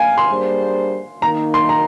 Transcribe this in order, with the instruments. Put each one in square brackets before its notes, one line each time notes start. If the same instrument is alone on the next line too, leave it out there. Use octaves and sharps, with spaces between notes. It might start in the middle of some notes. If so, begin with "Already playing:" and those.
Already playing: [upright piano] F5 G#5
C6
[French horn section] G3 A#3 D4 G#4 C5
[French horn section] D#3 A#3 D#4 [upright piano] A#5
[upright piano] C6
A#5